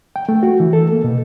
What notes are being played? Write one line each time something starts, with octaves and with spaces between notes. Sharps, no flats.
G5
A3
F#4
E3
A4
A#3
B2